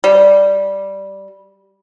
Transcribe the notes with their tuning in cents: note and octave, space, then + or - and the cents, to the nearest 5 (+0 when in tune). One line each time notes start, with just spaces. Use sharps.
G3 -5